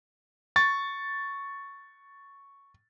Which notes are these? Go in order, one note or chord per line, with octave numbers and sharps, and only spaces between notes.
C#6 A6